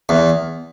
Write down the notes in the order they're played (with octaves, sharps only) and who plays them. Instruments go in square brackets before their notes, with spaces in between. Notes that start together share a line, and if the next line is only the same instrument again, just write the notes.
[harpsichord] E2